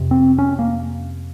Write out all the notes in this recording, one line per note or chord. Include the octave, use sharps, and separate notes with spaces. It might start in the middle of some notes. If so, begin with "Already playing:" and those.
Already playing: F2 C3
C4
C#4
A#3